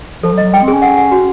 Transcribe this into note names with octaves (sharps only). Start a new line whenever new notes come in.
F3 A4
F#3
D#5
F#3
G3 G5
C4
G#4
C#4
F#5
F#5
F#4